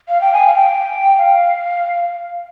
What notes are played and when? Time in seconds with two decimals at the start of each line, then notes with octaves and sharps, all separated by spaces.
0.08 F5
0.21 G5
0.33 G#5
0.47 F5
0.55 G5
1.18 F5